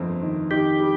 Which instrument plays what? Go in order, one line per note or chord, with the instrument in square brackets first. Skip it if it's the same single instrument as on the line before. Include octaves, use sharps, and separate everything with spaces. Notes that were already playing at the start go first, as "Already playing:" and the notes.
Already playing: [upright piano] G1 F2 C4
D#3
[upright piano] D#3 [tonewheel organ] G4
[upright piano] G3